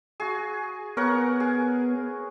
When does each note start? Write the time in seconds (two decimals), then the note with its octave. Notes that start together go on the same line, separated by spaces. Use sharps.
0.20 F#4 G#4
0.97 B3 A#4 C#5 F#5
1.40 G#4